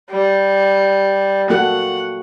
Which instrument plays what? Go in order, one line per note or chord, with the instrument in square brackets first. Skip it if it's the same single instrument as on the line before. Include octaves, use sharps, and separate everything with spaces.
[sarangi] G3
[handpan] A#3 F#4 A4 [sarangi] F#5